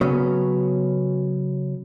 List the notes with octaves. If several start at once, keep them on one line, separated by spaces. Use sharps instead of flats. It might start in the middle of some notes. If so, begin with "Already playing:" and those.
C#3 F#3 B3 C#4